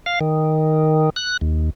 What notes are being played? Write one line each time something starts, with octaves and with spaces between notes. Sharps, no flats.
F5
D#3
F#6
D#2